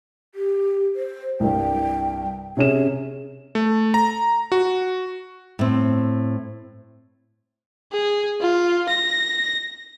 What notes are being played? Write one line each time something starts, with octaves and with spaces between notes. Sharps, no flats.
G4
C5
C2 G2 G5
C3 C#4 G#4 E7
A3
A#5
F#4
A2 C4
G#4
F4
A#6